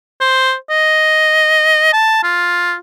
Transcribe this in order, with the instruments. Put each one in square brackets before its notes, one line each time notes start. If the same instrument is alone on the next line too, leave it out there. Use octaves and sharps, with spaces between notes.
[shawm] C5
D#5
A5
F4